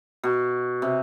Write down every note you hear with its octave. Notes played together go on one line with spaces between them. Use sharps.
B2
C3